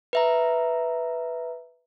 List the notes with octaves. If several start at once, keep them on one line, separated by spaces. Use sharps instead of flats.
B4 E5 A#5